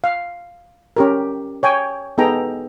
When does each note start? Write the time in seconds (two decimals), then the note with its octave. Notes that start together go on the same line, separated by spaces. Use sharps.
0.04 F5
0.97 C#4 G4 A#4
1.63 C#5 G5 G#5
2.18 B3 D#4 G#4 A4 G5 A#5